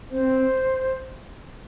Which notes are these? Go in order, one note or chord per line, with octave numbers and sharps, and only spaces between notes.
C4 C5